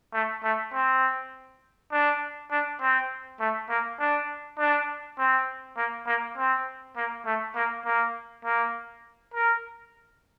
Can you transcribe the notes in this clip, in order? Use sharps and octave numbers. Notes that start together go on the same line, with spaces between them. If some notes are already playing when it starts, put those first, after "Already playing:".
A3
A3
C4
D4
D4
C4
A3
A#3
D4
D4
C4
A#3
A#3
C4
A#3
A3
A#3
A#3
A#3
A#4